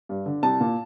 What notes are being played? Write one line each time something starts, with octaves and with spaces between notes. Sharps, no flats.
G2
D3
C2 A5
A#2